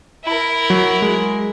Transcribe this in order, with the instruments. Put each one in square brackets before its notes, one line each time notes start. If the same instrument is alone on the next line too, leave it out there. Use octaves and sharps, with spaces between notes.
[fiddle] E4 A#4
[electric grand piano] F#3
G#3